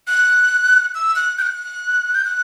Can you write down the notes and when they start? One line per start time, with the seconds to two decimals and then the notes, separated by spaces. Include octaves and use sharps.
0.07 F#6
0.95 E6
1.16 F#6
1.38 G6
1.42 F#6
2.15 G6
2.25 F#6